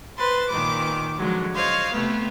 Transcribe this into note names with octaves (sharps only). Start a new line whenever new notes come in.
B4 C5 C6 A6
A#2 D#3 D6
D3 F3 F#3 G#3
C5 C#5 D#5 F5
C3 A3 B3